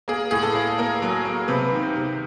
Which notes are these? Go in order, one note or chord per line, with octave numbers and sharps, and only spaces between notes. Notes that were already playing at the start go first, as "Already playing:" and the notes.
A#3 G#4
A2 G#4
A4
A#3
A#3 A#4
F#3
A#3
C3 B4
D#3
C3